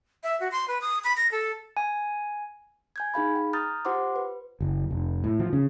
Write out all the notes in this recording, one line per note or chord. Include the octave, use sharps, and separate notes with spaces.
E5
F#4
C6
B4
D#6
B5
A#6
A4
G#5
G#5 G6 G#6
D#4 G#4 F5 B5
G5
A#5 D#6 F6 G6 A6
F4 G4 C5 F#5 C6 D6
B4
F#1
F1
A2
F3
C#3